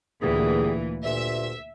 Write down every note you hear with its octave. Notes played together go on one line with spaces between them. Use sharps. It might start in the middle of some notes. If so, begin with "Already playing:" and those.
D2 A#2 E3 G3 B3 G#4
D2 G2 A#2 E5